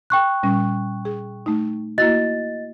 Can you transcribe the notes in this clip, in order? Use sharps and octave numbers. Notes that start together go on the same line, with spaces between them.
G5 C#6 F#6
A#2 G3 C#4
G#4
A3 D#4
A#3 E4 F#4 D#5 A6